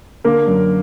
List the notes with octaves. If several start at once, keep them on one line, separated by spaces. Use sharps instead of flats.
D3 A#3 A#4
F#2